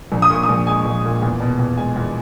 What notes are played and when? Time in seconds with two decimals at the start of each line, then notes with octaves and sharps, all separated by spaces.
0.12 A#1
0.22 D#6
0.30 A#2 C#6
0.43 D#6
0.49 A#1
0.67 G#3 G#5
0.85 A#1
1.05 A#2
1.22 E2
1.40 B2
1.59 E2
1.77 G#3 G#5
1.96 E2